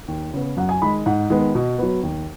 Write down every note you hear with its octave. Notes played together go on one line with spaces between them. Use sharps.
D#2
C#3 B3
F#2 F#5
G#5
D#3 G#3 B5
G#2 F#5
D#3 G#3 B3
B2
F#3 B3
D#2